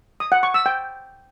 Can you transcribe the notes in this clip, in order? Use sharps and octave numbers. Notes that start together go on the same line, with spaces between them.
D#6
F#5
C#6
E6
G5